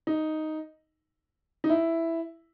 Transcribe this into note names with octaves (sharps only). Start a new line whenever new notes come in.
D#4
D#4
E4